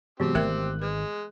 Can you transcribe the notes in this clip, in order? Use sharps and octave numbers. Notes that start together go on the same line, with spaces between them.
C3 E3 F#3 G#3 B3 C4 G4
G#1 A3 A#4 E5 F#6
G#3 B4